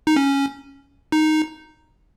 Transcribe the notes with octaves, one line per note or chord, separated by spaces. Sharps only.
D#4
C#4
D#4